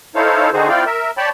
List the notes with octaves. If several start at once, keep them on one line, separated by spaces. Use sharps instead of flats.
D#4 E4 A4 C5 C#5 F5
D3 D#3 D#4 F#4 G#4 C5
C4 E4 F4 D5 F5 G5
A#4 E5
C#5 D5 G5 A5 B5